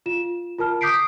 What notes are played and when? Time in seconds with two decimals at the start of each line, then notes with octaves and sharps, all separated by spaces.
0.06 F4 E7
0.59 F4 A#4 A5 F6
0.81 D6 D#6 G6 B6 C7 D7